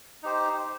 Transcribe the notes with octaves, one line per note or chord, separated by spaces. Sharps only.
D#4 G4 C5